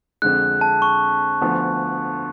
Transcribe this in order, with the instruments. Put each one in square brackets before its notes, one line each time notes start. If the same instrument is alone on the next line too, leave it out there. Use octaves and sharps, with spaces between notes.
[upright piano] F2 D3 G#3 [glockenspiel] F#6
[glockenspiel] A5
C#6
[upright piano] D2 D3 F3 B3